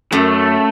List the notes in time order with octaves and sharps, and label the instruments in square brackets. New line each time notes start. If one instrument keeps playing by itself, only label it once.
[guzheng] F#2 [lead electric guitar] A3